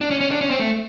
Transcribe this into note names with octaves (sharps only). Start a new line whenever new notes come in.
D4
C#4
C#4
D4
C#4
C4
A3